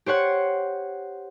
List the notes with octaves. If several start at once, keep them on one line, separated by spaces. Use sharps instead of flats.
G4 C5 C#5 F#5